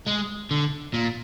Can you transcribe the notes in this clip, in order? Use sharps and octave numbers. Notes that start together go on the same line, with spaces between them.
G#3
D3
A#2